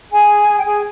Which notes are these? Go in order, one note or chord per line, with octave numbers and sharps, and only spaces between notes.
G#4 G#5
G5
G#4 G#5